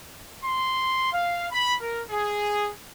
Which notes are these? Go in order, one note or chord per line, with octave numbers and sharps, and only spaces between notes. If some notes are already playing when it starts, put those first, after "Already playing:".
C6
F5
B5
A#4
G#4